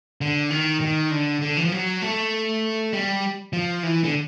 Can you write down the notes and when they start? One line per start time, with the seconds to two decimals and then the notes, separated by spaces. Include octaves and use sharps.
0.21 D3
0.51 D#3
0.81 D#3
1.11 D3
1.41 D3
1.57 E3
1.64 F3
1.72 F#3
2.02 A3
2.93 G3
3.53 F3
3.83 E3
4.04 D3